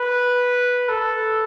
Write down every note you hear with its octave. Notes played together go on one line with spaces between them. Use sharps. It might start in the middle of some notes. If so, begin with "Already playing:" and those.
Already playing: B4
A4